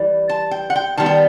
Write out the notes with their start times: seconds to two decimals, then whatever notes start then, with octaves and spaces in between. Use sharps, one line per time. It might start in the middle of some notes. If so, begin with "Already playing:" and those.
Already playing: E3 G3
0.29 A5
0.51 G5
0.70 F#5
0.76 G5
0.98 D#3 G3 B3 A5
1.06 G5